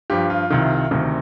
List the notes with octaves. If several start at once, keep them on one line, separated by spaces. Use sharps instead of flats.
G2 F3 G4
F4
C2 C3 D#3
D2 C3 D#3